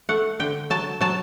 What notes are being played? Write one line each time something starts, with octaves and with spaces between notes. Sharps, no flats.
A3 F#5
D3 G5
F#3 A5
F#3 A5